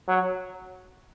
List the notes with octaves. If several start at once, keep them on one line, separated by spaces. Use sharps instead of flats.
F#3